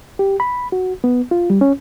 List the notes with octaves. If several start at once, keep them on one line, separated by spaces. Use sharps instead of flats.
G4
B5
F#4
B3
F4
G3
C#4